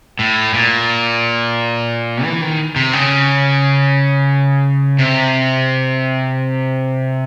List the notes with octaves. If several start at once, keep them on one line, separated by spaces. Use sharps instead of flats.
A2
A#2
E3
D#3
C3
C#3
C3